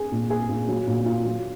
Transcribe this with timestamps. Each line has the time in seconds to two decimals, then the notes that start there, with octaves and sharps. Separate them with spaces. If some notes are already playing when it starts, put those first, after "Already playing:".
Already playing: G#4
0.12 A#2
0.30 G#4
0.49 A#2
0.69 F#3
0.87 A#2
1.06 F4
1.25 F#3